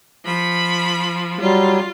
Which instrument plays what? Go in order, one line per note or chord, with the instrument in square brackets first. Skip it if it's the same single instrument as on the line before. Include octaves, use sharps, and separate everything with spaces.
[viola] F3 B5
[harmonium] F#3 G3 [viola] F4